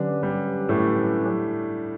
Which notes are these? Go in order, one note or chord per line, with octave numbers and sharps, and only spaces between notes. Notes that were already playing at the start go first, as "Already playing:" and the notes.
Already playing: D3 F#3 C#4 D4 G4 B4
G3
A2 A3